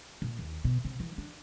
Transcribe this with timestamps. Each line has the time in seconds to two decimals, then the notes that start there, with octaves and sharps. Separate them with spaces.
0.22 A#2
0.39 D#2
0.64 B2
0.85 C3
1.00 E3
1.18 D4